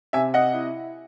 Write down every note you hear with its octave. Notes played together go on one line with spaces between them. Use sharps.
C3 E5 G#5
D#5 F#5
E4